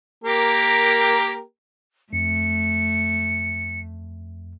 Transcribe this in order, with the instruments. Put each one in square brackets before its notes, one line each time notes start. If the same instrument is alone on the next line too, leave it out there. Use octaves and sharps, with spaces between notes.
[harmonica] A#3 G4 A#4
[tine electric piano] F2 [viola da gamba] A3 [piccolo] C#7